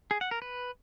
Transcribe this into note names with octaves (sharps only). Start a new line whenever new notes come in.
G#4
F#5
A#4
B4